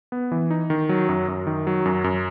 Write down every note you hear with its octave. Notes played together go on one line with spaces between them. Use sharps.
B3
E3
D#4
D#3
F#3
F#2
F#2
D#3
F#3
F#2
F#2